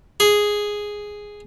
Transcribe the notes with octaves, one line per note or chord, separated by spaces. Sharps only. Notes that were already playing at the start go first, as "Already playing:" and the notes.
G#4